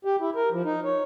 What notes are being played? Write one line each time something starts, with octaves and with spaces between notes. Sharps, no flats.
G4
E4
A#4
F3
D#4
C#5